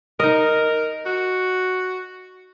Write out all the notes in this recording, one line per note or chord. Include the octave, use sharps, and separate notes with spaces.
D#4 A#4 D#5
F#4